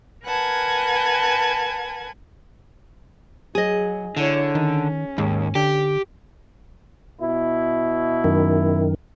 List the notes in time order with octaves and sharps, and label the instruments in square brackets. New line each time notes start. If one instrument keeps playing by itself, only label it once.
[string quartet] A#4 B4 F#5 G#5 A5 G#6
[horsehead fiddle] F#3 [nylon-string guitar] G#4 D#5
[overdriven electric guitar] D3 [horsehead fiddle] E4 C#5
[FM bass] D#3 [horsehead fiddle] C#4
[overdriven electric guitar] D#2 [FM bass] G#2
[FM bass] D3 [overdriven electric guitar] G4
[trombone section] B2 E4
[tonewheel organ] F#2 D#3